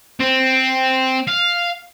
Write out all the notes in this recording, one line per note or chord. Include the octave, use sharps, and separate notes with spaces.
C4
F5